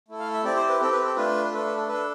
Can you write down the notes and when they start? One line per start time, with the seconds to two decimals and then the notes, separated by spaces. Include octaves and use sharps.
0.08 A3 E4 A4
0.20 F5
0.33 E5
0.44 C4 E4 G4 D5
0.56 C5
0.69 B4
0.80 C4 G4 A4
0.92 B4
1.04 A4
1.16 A3 D4 F4 B4
1.52 A3 D4 A4 B4
1.65 B4
1.77 A4
1.89 D4 A4 B4